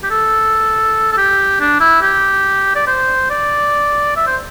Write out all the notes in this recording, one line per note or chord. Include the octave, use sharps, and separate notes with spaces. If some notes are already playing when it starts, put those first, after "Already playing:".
G4
A4
A4
G4
D4
E4
G4
D5
C5
D5
E5
C5